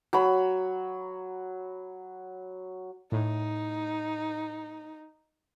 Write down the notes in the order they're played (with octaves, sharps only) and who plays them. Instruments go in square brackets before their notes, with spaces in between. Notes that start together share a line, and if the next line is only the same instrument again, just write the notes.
[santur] F#3 B5
[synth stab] A2 [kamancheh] D#4